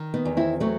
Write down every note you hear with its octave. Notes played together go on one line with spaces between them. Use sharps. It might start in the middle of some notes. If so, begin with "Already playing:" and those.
Already playing: D#3
B3 D#4
E2
C4 E4
F#3 A3 C4